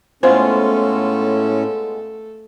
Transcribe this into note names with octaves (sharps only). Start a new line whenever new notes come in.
A2 G#3 A3 B3 C#4 F4 A4 C5